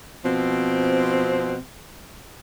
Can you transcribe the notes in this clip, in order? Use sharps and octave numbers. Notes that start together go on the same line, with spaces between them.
B2 F3 C4